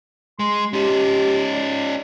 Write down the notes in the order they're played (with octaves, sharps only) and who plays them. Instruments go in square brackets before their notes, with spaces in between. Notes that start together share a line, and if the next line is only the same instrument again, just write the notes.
[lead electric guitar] G#3 [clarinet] C6
[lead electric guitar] C#4 D#4 [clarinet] G4
[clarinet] D5